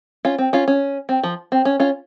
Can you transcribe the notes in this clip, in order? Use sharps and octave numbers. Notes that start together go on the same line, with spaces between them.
C#4 F4
C4
C#4 F4
C#4
C4
F3
C4
C#4
C#4 F4